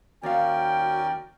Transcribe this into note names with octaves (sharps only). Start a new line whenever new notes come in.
D#2 C#4 F#4 A#4 D5 F5 G5